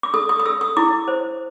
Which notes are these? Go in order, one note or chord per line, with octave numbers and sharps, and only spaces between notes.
D6
A4 D#6
D#6
D#6
A4 E6
D#6
E4 D6
C5